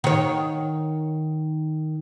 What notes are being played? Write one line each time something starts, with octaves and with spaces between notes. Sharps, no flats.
D#3 C#5